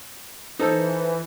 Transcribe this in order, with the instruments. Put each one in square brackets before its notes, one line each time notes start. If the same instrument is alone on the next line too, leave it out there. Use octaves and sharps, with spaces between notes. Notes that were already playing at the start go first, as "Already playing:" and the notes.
[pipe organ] E3 [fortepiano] D#4 A4 E6 [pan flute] C5